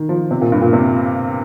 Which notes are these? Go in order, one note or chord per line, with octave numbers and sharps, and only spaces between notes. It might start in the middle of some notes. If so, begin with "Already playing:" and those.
Already playing: D#3
F3
C3
A#2
G2
A#2
C3